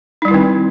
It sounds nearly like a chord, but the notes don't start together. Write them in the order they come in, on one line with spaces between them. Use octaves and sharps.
D#4 G3 E4 D#3 C4